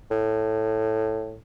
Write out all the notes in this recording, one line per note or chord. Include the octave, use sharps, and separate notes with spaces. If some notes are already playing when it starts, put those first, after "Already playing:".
A2